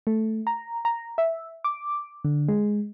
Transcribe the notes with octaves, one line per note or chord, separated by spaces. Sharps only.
A3
A#5
A#5
E5
D6
D3
G#3